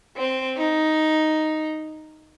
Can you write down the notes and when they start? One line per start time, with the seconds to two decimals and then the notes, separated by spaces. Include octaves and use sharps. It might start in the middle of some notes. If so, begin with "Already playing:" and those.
0.17 C4
0.56 D#4